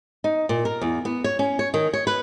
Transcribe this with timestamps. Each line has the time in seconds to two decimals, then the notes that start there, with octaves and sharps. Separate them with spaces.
0.24 D#4
0.49 A#2
0.65 A#4
0.81 E2
1.05 B3
1.24 C#5
1.39 C#4
1.59 C#5
1.74 D#3
1.93 C#5
2.07 B4